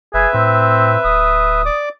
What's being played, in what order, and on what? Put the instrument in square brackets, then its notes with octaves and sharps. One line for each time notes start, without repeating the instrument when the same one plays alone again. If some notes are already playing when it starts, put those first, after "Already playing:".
[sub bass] F#1 [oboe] G#4 [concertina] B4 E5
[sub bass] A2 [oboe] C4
[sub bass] D1 [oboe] D#6
[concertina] D5 D6